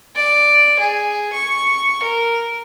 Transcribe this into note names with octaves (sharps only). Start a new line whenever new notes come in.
D5
G#4
C#6
A#4